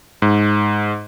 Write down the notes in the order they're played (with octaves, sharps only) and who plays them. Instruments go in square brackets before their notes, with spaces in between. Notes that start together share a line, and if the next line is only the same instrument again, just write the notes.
[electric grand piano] G#2